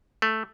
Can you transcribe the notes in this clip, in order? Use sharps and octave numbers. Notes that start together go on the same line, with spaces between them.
A3